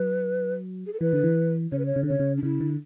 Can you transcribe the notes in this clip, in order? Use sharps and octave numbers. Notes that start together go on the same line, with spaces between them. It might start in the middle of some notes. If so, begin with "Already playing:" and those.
Already playing: F#3 B4
G#4
A4
E3 B4
D3
E3
C#3 C#5
B4
C#5
C#3
D3
C#3 C#5
C#3
D4
C#3 E4
D3